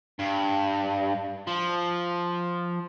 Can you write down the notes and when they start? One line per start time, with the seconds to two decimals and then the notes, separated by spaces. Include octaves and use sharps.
0.19 G2
1.47 F3